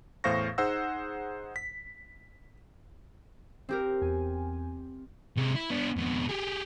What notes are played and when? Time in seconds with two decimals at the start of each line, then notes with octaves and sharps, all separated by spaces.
0.24 E2 A2 C5 F5 C#6 A#6
0.58 D#4 G#4 C5 F#5 E6
1.56 B6
3.69 C4 G4 A#4
4.01 E2 G#5
5.37 C3 G#3
5.56 E4
5.70 B3 D4
5.96 F2 B2
6.29 G4 G#4